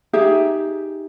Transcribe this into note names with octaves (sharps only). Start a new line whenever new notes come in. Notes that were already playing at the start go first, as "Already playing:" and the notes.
D#4 G4 G#4 E5